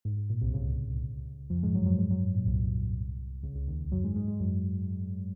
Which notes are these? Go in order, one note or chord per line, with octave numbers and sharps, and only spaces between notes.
G#2
G#2
A#2
C2 C3
C#2 C#3
F2 F3
G#2 G#3
F#2 F#3
F#2 F#3
G#2 G#3
F#2 F#3
G#2
A#2
C2 C3
C#2 C#3
C#2 C#3
D#2 D#3
F#2 F#3
G#2 G#3
G#2 G#3
G#2 G#3
F#2 F#3